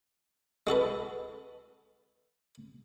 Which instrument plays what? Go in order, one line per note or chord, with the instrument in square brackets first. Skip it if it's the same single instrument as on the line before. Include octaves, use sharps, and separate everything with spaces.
[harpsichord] G#3 F#4 A4 B4